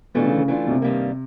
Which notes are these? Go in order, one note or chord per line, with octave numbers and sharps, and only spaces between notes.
B2 E3 A3 D4 F4
C#3
C#3
E3 A3 D4 F4
B2
C3
G2 D#3 G3 A#3